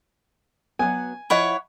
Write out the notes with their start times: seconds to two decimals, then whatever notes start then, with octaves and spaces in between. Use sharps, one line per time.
0.79 F#3 B3 G#5
1.30 F3 E4 C#5 D#5 F#5 B5